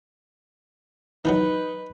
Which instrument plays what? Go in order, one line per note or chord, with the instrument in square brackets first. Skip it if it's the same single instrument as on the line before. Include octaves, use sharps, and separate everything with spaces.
[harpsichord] D#3 E3 F#3 [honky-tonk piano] D#4 [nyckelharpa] B4